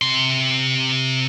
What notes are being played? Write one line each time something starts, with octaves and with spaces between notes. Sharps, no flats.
C3 C6